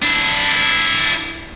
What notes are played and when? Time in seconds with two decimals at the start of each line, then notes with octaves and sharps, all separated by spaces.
0.02 D4 E4